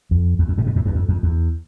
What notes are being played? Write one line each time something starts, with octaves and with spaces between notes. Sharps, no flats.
F2
E2
F2
A2 C3
G2 B2
F2 A2
E2 G2
F2
F2
E2